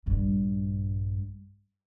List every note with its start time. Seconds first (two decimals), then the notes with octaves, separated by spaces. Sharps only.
0.06 A#1 G2